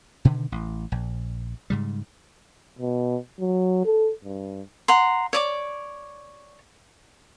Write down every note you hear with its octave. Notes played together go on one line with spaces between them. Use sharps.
B2 D3 D#3
A1
A#1
G#2 C#3 G3
B2
F#3
A4
G2
F#5 A#5 C6
C#5 D5 D6